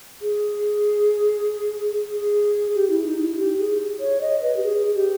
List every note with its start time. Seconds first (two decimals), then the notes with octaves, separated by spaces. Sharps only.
0.22 G#4
2.11 G#4
2.75 G4
2.90 E4
3.06 D#4
3.22 E4
3.37 G4
3.58 G#4
4.00 C#5
4.21 D#5
4.42 B4
4.57 G4
4.63 G#4
4.95 G4